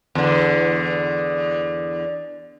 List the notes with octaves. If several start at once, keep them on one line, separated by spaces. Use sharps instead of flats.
E2 D3